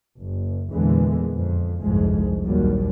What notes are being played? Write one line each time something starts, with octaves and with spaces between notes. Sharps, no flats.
F#1
E2 A#2 D3 E3 G#3
F2
G1 C2 F2 G#2 G#3
A#1 D#2 F#3 G3